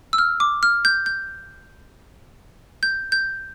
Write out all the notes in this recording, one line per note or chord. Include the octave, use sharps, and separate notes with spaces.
E6
F6
D6
F6
G6
G6
G6
G6